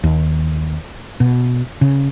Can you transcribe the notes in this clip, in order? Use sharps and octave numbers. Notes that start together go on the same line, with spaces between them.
D#2
B2
C#3